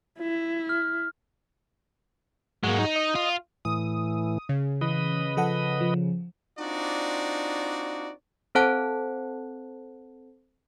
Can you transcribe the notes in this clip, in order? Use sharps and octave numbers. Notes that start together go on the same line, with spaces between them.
E4
F6
G#2 F#3 G#3 A#3
D#4
D#5
F4
A2 E3 D#6
C#3
E3 B4 D#5
F3 A4 F#5
F3
C4 D4 D#4 F4 F#4 D5
C4 A4 C5 F#5 A5 F#6